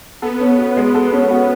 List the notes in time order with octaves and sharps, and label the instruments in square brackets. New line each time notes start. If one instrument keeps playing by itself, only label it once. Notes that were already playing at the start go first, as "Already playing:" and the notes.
[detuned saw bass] B3 [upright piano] A4
[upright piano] C#4
F#4
G#3
A4
C#4
F#4